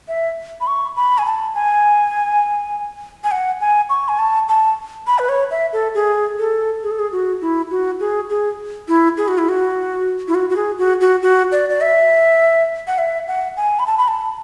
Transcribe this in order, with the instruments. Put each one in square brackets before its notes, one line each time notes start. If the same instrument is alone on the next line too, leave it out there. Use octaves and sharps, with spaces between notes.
[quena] E5
B5
C#6
B5
G#5
A5
G#5
G#5
F#5
G#5
C#6
G#5
A5
A5
B5
B4
C#5
E5
A4
G#4
A4
G#4
A4
G#4
F#4
E4
F#4
G#4
G#4
E4
G#4
F#4
E4
F#4
E4
F#4
F#4
G#4
F#4
F#4
F#4
D5
D5
E5
F#5
E5
F#5
G#5
B5
A5
B5
A5